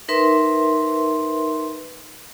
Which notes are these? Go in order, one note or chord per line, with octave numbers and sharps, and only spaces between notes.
D#4 A#4 B4 E5 C6